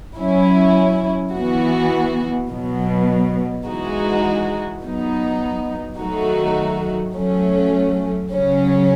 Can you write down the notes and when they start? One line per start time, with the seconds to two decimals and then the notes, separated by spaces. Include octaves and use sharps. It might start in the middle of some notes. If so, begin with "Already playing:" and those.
0.17 F#3 C#4 E4
1.33 E3 B3 F#4
2.50 B2 F#3 B3
3.66 E3 G#3 D#4 F#4
4.83 F#3 B3 D#4
5.99 D#3 F#3 A3 D#4 F#4
7.15 F#3 A3 C#4
8.31 C#3 F#3 C#4